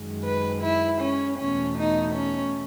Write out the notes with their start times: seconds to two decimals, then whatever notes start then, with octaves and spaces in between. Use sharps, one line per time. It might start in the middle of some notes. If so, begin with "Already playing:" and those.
Already playing: F#2 D#3 G#3
0.24 B4
0.61 E4
1.00 C#4
1.38 E2 B2 A3 C#4
1.77 D#4
2.15 C#4